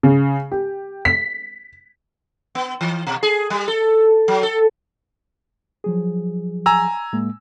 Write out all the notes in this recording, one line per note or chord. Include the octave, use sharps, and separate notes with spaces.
C#3
G4
B6
B3
E3
B2
G#4
G3
A4
F#3
A4
F3 F#3 G#4
G#5 A#5 E6
A2 G#3 A#3